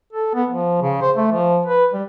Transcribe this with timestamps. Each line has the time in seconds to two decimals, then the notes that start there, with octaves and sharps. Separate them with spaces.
0.12 A4
0.34 B3
0.49 F3
0.81 C#3
1.01 C5
1.17 A3
1.31 F3
1.66 B4
1.93 G3